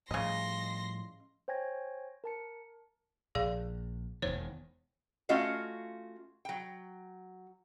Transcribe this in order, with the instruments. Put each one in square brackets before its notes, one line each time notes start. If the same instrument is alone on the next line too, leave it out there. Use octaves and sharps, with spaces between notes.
[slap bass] A2 F3 G3 [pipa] C#3 D#5 [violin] C6 A#6
[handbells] C5 C#5 G5 G#5 G#6 A#6
A#4 A5 C#7
[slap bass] A#1 [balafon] G#4 D5 F5
[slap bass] E1 E2 D#3 [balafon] C5 C#5
[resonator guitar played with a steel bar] A3 C#4 F4 F#4 D#5 F5
F#3 G5